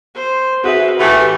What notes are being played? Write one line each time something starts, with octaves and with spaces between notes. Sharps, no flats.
C5
F#4 G#4 B4 E5
A2 E3 A3 G4